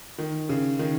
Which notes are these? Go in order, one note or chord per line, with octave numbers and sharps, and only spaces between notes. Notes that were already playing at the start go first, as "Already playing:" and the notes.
D#3
C#3
D#3